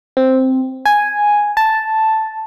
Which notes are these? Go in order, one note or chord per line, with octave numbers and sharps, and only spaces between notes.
C4
G#5
A5